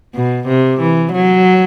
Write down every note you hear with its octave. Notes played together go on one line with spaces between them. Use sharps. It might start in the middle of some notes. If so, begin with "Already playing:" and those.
B2
C3
E3
F#3